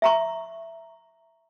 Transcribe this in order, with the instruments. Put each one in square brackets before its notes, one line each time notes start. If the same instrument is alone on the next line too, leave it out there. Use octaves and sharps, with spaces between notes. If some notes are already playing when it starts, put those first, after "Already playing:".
[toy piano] E5 A#5 C#6